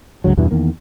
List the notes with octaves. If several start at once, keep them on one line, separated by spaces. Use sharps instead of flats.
C#2 G2 C#3 F#3
E2 G2 B2 E3
E2 D#3 A#3